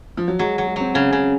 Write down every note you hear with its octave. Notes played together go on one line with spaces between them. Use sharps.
F3
F#3
F#3 G#3
F#3
G#3
F#3 C4
C#3 C#4
C#3